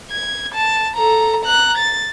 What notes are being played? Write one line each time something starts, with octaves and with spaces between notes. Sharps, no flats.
G#6
A5
A4 A#5
A#5 F#6
A6